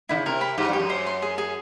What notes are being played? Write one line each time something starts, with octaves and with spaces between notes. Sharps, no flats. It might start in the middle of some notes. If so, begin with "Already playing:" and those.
D3 E4
C#3
C3 A#4
B5
G#2 G4
G2 G4
F#2
C5
C6
G#4
G#4